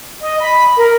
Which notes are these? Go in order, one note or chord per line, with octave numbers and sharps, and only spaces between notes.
D#5
B5
A#4